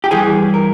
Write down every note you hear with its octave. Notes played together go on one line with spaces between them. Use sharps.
G4
G2 E3 G#4
A#4